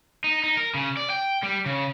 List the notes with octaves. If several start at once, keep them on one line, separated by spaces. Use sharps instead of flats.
D#4
D#4
A#4
C#3
D5
G5
G3
C#3